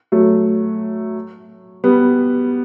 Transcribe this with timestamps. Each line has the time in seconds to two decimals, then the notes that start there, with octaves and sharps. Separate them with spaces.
0.12 F#3 A3
1.84 G3 B3